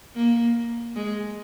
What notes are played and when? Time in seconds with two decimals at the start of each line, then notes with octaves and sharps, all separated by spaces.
0.15 A#3
0.96 G#3